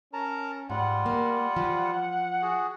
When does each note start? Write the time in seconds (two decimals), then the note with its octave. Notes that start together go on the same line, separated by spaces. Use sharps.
0.13 C#4 A#4 A5 A#5
0.70 G#2 G3 F4 F#5
1.06 A#3
1.56 F3
2.42 F#4 G#4